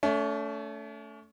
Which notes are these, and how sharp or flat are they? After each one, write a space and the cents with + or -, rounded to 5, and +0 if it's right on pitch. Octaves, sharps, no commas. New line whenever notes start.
A3 +0 C#4 +40